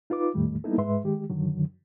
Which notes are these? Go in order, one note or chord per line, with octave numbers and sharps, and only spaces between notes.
D#4 F4 B4 D6
E2 A2 D#3 G3 A3
G3 A#3 B3 D#4 E4 A4
G#2 G#3 B4 E5 C6
D#3 G#3 G4
F#2 D3 D#3 F#3